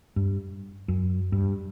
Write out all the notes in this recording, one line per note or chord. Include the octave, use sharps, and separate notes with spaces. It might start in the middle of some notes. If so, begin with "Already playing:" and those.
G2
F#2
G2